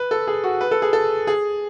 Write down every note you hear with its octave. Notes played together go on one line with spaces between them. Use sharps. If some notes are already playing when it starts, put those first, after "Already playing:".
Already playing: B4
A4
G#4
F#4
B4
A4
G#4
A4
G#4